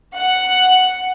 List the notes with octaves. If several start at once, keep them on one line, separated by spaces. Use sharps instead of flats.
F#5